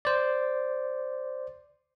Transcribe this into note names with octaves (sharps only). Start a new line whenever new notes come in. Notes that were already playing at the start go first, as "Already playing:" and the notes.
C5 D5